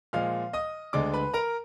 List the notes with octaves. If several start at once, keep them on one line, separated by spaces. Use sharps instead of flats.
A#2 F3 G#3 F5 F6
D#5 D#6
D2 D3 G#3 D5 D6
B4 B5
A#4 A#5